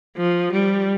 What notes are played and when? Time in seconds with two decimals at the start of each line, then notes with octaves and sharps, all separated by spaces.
0.17 F3
0.52 G3